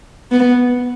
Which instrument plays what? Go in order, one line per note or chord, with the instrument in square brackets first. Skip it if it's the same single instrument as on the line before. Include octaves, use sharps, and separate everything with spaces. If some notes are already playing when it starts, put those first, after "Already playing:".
[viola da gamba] B3